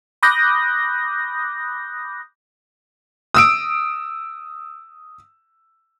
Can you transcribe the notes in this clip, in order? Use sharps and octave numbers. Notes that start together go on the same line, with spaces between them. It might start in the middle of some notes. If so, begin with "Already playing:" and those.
B5 D6 D#6 F#6 G6 A#6
D#6 E6 D7